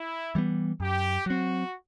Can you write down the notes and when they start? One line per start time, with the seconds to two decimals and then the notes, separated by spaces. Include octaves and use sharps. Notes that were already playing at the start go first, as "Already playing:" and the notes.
Already playing: E4
0.35 E3 G3 B3
0.80 F#2 G4
1.26 F#3 C4 F#4